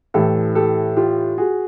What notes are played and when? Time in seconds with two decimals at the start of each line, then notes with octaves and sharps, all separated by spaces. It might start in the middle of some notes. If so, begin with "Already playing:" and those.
0.14 A2 E3 G4 A4
0.55 G4 A4
0.97 F4 G4
1.38 F#4 G#4